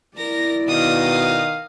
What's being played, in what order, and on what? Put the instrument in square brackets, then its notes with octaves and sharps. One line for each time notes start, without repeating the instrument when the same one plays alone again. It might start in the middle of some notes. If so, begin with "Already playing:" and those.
[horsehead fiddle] E4 D5 [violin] A#4 A#6
[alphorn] B2 [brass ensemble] D#3 F5 [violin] D#5 D#6